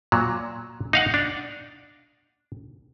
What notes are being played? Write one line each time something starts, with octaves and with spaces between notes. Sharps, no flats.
A#2 F#3
D#4 F5 F#5
D4